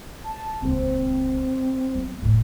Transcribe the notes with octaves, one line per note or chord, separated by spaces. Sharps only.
A5
D#1 C#2 C4
F#3 B3
F1 A2